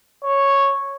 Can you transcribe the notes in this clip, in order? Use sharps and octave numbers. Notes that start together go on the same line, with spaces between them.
C#5